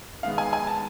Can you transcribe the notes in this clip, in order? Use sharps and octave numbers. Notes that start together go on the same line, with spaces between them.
D#3 G#3 B3 F5
G#5
G#5
A5